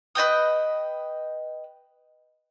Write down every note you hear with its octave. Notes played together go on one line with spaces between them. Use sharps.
B4 D#5 G5 D#6